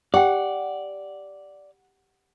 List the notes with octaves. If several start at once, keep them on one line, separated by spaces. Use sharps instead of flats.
G4 D5 F#5 G5